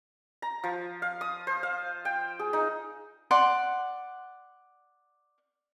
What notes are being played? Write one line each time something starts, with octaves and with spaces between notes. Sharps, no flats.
A#5
F3
F5
D#6
C5
F5
G5
G#4
D#4
D5 F#5 C6